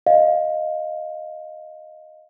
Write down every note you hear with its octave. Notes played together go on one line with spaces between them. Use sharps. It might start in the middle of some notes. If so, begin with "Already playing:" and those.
D#5 F5